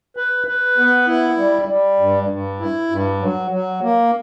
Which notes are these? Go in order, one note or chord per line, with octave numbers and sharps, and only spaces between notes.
B4
B4
B3
E4
G3
G3
G2
G2
E4
G2
F#3
F#3
A#3